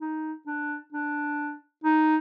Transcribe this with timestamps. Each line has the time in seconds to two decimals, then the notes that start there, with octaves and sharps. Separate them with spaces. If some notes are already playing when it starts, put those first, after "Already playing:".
0.01 D#4
0.46 D4
0.93 D4
1.84 D#4